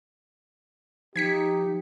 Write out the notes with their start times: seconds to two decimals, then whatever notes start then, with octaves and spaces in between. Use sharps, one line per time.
1.16 F3 D#4 G4 G#6 B6 C#7